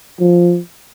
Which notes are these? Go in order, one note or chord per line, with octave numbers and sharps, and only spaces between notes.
F3